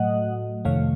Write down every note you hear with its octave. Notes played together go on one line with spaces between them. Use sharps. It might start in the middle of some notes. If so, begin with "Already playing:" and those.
Already playing: A2 F#3 A3 D#5 F#5
F2 C3 D#3 A3 C#5 F5